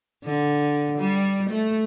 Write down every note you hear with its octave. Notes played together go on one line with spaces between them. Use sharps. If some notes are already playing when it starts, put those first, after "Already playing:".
D3
G3
A3